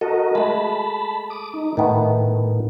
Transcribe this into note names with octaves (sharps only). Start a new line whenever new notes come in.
F#4 A4 A#4 D#5
G#3 A3 A5 B5
D6 D#6
D#4
A2 D#3 A3 B3